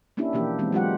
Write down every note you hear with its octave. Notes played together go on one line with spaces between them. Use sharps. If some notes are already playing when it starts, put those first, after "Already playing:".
A#3 C#4 D4 E4 G4
B2 E3 F3 A#3 D4 G4
E3 G#3 B3 C4
F#3 G#3 F4 G4 F#5